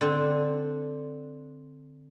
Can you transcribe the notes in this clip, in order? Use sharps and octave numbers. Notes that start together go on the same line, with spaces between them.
D3 C4 D4